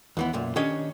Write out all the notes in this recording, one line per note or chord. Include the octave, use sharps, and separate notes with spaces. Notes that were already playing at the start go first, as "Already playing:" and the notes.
D#2 E3 B3
B1 F#2 A#2
D#3 C#4 D4 G4 C#5 D#5